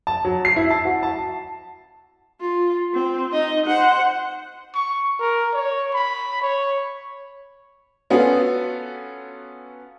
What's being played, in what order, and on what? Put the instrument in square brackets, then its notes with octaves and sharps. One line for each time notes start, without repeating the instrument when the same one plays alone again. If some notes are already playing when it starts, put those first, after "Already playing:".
[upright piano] A5
F#3
C7
E4
A5
F#4
A5
[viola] F4
C4
D#4 D#5
C5 F#5
[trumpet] C#6
A#4
C#5
B5
C#5
[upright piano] B3 C#4 F4 F#4 A4 B4